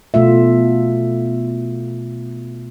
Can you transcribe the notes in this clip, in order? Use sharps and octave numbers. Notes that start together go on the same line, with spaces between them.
B2 A3 F4 E5